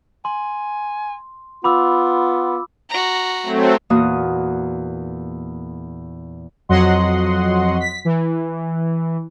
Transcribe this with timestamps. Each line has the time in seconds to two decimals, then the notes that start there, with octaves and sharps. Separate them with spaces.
0.25 G#5 C6
1.64 B3 F4 B5 D6 E6
2.90 F#4 A#5
3.43 F#3 A3 C4
3.90 E2 A#2 A#3 F#4 D#6
6.69 F2 F#3 F#4 D#5 F#5 C6
7.80 B6
8.05 E3